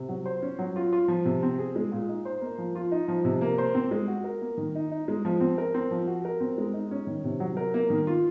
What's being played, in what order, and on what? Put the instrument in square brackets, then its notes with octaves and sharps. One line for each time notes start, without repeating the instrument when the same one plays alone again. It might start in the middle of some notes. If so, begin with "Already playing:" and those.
Already playing: [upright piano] C3
F#3
C5
C#4
F#3
F4
F4
F3
C3
C4
G#4
G#3
A#2
D#4
C5
A#3
F3
F4
D#4
F3
C3
A#3
C5
C4
G#3
F#4
A#4
A#3
D#3
D#4
D#4
G#3
F3
C4
A#4
C4
F3
F#4
A#4
C4
G#3
D#4
C#4
D#3
C3
F#3
A#4
A#3
D#3
F4